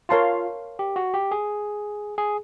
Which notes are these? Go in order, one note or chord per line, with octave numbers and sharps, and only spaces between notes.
F4 A#4 C#5 F5 A5 C6
G4
F#4
G4
G#4
G#4